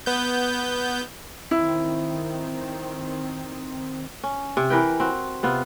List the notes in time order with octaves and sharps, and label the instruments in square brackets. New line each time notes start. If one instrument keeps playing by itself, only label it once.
[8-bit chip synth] B3 G6
[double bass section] D#3 C4 [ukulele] E4
[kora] C#4
C3
E3 A#4 B4 G5
C4 F#4
C3 B3 F4